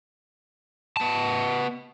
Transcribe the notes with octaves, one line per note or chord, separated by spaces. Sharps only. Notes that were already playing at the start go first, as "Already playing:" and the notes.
B3 A5